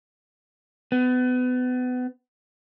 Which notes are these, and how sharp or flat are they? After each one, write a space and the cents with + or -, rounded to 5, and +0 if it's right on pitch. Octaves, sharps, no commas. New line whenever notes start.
B3 +30